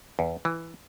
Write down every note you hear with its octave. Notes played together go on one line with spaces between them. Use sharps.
E2
E3